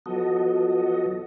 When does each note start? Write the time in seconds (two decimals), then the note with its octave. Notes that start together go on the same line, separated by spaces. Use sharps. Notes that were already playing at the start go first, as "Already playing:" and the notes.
0.06 F3 F#3 B3 F#4 A4 D#5